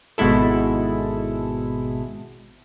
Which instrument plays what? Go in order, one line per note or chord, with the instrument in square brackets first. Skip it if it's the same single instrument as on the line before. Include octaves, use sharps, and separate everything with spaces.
[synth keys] G#1 B2 G#3 E4 A4